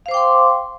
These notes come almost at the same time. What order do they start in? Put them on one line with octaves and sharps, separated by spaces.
F5 C5 D6 G5 C6